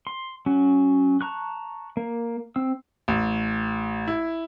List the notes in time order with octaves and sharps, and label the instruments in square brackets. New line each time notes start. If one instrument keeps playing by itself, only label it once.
[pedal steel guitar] C6
F#3 C#4 F#4
A5 A#5 C#6 F#6
A#3
C4 E6
[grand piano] A1
E4